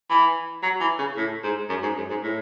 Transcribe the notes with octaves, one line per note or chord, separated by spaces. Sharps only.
E3
F#3
E3
C#3
A2
G#2
F#2
G#2
F#2
G#2
A2